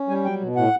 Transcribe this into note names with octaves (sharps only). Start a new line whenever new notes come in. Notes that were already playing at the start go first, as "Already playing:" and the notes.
Already playing: C#4
G3 G#5
F#3 G5
B2
A2 F#5